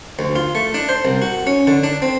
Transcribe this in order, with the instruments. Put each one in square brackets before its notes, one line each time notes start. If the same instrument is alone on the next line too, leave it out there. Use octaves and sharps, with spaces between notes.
[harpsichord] D2
F4
A3
D4
C5
C2
F#4
C#4
D3
D4
C4